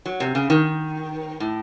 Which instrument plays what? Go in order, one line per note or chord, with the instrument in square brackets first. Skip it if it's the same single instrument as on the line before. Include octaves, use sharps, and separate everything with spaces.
[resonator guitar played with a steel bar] F#3
C3
C#3
D#3
A2